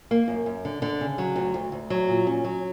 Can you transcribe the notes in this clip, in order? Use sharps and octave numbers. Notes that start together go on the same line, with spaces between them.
A#3
F#2
F#2
D3
D3
C#3
F#3
D2
D2
D2
F#3
A#2
C#4
F#3